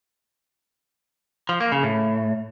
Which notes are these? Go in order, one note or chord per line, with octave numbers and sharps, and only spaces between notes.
F3
A#3
C#3
A2